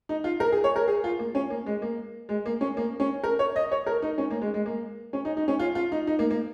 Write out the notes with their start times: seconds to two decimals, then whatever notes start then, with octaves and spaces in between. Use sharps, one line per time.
0.09 D#4
0.24 F4
0.40 A#4
0.52 G#4
0.64 C#5
0.76 A#4
0.88 G#4
1.04 F4
1.19 A#3
1.35 C#4
1.50 A#3
1.66 G#3
1.82 A#3
2.29 G#3
2.46 A#3
2.61 C#4
2.77 A#3
3.00 C#4
3.24 A#4
3.39 C#5
3.56 D#5
3.72 C#5
3.86 A#4
4.02 D#4
4.18 C#4
4.30 A#3
4.42 G#3
4.54 G#3
4.66 A#3
5.13 C#4
5.25 D#4
5.37 D#4
5.48 C#4
5.60 F4
5.75 F4
5.92 D#4
6.07 D#4
6.19 A#3
6.30 A#3